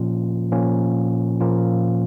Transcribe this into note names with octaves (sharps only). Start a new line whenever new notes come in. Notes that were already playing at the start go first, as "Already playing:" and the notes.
Already playing: A#2 F3 A#3 C#4 F4
A#2 F3 A#3 C#4 F4
A#2 F3 A#3 C#4 F4